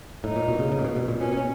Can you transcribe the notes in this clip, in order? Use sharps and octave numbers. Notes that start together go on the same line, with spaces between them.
A2 D#4
A#2
B2
C#3
C#3
A#2
B2
B2
A#2
B2 C#4